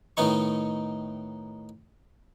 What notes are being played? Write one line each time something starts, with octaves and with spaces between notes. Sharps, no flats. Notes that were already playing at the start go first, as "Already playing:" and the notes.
A2 D#3 B3 D#4 C#6